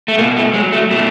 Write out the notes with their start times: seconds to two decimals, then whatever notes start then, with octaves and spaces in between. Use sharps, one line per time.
0.08 A3
0.18 B2 A#3
0.37 A3
0.54 F#3 G#3
0.72 A3
0.91 B2 A3